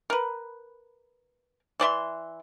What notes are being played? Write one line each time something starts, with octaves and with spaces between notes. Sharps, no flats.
A#4 B4
E3 D5 E5 C6